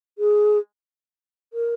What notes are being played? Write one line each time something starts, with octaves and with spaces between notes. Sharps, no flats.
G#4
A#4